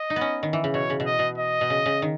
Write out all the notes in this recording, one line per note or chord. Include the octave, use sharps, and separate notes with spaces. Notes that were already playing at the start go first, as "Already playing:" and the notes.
Already playing: D#5
D#4
B3
C#4
D#3
E3
C#3
B2 C#5
C#3
B2
D#5
B2
D#5
B2
C#3
C#3
D#3